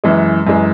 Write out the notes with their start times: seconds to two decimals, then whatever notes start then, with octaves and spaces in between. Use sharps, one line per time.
0.04 F#2 E3 G#3
0.47 F#2 E3 G#3